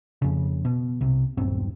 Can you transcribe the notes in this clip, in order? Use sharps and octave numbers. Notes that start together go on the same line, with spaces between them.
F2 C#3
B2
C2 C3
D#1 B1 G2 C4